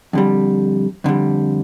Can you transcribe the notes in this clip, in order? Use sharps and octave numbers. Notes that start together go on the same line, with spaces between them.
F2 D3 G3
F2 D3 G3